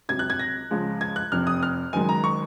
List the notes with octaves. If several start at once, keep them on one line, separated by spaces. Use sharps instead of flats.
C#2 C3 F#3 G#6
F#6
G#6
A#6
C#2 C#3 F3 G#3
G#6
F#6
F1 F2 C3 F6
D#6
F6
F#1 F#2 D#3 G#3 G#5
A#5
C#6